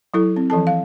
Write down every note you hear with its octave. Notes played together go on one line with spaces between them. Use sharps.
F#3 E4 A4
C4
E3 F3 A4 A5
F5